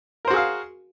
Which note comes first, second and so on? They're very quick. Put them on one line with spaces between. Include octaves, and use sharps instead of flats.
A#4 C5 F#4 G#4 F5